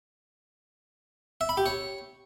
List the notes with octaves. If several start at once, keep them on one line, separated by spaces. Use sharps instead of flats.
E5
B5
G4
C#5